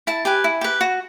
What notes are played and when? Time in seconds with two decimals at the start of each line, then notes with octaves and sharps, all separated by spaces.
0.07 E4 A5
0.25 G4 B4 G#5
0.44 E4
0.61 G4 B4
0.81 F#4